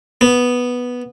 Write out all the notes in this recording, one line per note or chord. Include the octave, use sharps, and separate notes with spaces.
B3